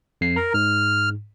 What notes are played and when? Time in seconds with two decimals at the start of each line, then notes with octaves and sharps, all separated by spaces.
0.21 F2 C7
0.36 A#4 A#5
0.54 G#2 F6